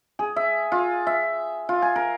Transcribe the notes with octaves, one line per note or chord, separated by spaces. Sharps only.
G#4
E5
F4
E5
F4
G#5
A#4